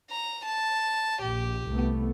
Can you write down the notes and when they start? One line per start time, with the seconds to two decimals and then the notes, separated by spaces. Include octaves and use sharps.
0.10 A#5
0.46 A5
1.22 A#1 G4
1.69 C2 A3 B3